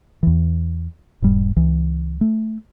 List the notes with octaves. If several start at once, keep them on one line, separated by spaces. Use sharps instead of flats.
E2 E3
E1 G#2 G3
C#2 E3
A3